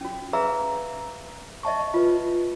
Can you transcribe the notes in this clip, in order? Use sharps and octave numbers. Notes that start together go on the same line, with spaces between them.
C#4 F#4
G#4 B4 E5 F5 A#5 E6
D#5 E5 A5 C#6
F4 B4